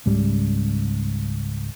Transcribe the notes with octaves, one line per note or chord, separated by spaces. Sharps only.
C#2 G#2 C#3 G3